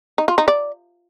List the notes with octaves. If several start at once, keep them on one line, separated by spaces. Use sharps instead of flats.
D#4
F4
D#4
D5